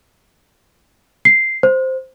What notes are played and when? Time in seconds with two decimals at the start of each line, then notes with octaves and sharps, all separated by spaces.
1.25 C7
1.63 C5